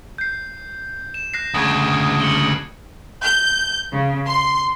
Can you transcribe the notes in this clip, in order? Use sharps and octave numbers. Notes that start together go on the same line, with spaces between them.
G6 C7
E7
F#6 A#6 C7
D2 C#3 D#6 G#6
C#7 F#7 G7
G6
C#3
C6